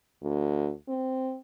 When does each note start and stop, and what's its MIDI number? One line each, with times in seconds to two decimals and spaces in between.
0.22 0.71 38
0.88 1.37 60